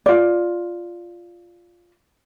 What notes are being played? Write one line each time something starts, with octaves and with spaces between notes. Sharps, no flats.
F4 D5